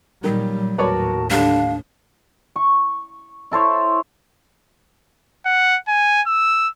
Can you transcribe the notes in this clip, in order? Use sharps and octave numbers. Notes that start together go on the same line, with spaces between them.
A#2 D#3 F#3 G3
D#2 A2 F#4 A#4 B4 C#5 D5 A5
D3 G3 D4 F5
C#6
E4 A4 C5 C#5
F#5
G#5
E6